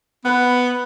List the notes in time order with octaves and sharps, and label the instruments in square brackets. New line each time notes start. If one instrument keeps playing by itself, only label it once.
[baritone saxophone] B3 [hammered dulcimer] B4 F#5